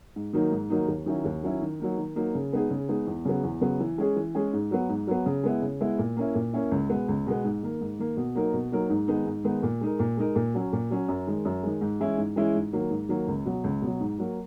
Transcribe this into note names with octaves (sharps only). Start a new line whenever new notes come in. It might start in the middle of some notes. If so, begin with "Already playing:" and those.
G#2
D#3 F#3 A#3 D#4
G#2
D#3 F#3 A#3 D#4
D#2
D#3 F#3 C#4 E4
D#2
D#3 F#3 C#4 E4
D#3
F#3 A#3 D#4
D#3
F#3 A#3 D#4
C#3
G#3 B3 D#4 G#4
C#3
G#3 B3 D#4 G#4
E2
C#3 F#3 B3
E2
C#3 F#3 B3
E3
G#3 C#4 G#4
E3
G#3 C#4 G#4
G#2
F#3 B3
G#2
F#3 B3
C#3
G#3 B3 E4
C#3
G#3 B3 E4
A#2
A#3 C#4 E4
A#2
A#3 C#4 E4
C#2
B2 G#3 B3
C#2
B2 G#3 B3
G#2
D#3 A#3
G#2
D#3 A#3
B2
F#3 A#3 D#4 A#4
B2
F#3 A#3 D#4 A#4
G#2
D#3 G#3 B3 D#4
G#2
D#3 G#3 B3 D#4
A#2
G#3 D#4 A#4
A#2
G#3 D#4 A#4
A#2
F#3 C#4
A#2
F#3 C#4
F#2
D#3 G#3
F#2
D#3 G#3
G#2
E3 G#3 C#4 E4
G#2
E3 G#3 C#4 E4
G#2
D#3 F#3 A#3
G#2
D#3 F#3 A#3
C#2
B2 F#3
C#2
B2 F#3
G#2
F#3 A#3